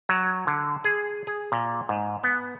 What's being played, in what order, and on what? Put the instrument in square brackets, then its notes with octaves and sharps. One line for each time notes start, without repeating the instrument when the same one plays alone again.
[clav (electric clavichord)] F#3
D3
G#4
G#4
A#2
G#2
B3